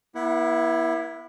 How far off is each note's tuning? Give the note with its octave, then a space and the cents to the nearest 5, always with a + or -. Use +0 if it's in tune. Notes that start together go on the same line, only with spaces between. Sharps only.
B3 -45 E4 +0 F#5 +0